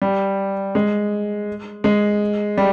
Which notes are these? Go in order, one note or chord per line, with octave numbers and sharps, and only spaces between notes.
G3
G#3
G#3
G3